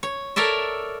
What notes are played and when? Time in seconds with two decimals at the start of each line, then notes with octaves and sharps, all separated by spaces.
0.03 C#5
0.36 A4 A#4 C#5 D5 E5